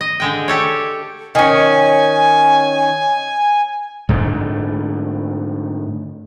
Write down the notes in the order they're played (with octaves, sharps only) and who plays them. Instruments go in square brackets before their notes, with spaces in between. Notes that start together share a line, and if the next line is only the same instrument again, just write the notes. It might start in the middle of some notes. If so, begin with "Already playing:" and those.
[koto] D#5
D3 G#3 G5
G4 A4 C#5
[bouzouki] D#3 C#4 [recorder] G#5
[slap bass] G#2 D3 A3